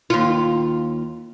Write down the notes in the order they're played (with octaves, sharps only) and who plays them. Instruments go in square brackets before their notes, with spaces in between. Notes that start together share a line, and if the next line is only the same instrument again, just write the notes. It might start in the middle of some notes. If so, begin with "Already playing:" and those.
[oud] D#2 F4